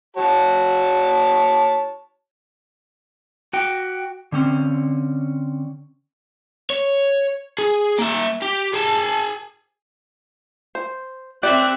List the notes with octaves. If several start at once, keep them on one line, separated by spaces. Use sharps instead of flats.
F#4 C#5 A5
F#4 G5
D3 C4 C#4
C#5
G#4
A#3 E5
G4
G#4 A5
C5
C4 G4 D5 E5 F#6